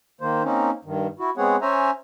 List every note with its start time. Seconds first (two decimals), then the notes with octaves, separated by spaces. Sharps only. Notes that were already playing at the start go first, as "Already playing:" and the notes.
0.21 D#3 A#3 C5
0.44 A#3 C4 C#4 D#4
0.85 G2 D#3
1.20 E4 F#4
1.37 G#3 B3 C4 G#4 C#5 F#5
1.62 C#4 C5 C#5 E5 G#5 A#5